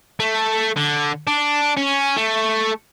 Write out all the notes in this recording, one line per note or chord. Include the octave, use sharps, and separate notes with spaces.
A3
D3
D4
C#4
A3